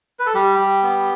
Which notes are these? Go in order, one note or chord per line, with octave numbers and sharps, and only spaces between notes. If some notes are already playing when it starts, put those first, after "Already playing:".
B4
A4
G3 G4
G3
B3